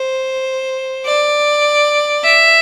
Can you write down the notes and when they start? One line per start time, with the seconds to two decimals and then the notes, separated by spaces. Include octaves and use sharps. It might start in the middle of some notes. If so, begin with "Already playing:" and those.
Already playing: C5
1.06 D5
2.24 E5